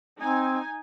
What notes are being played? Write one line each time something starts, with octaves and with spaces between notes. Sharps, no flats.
C4 D#4 G#5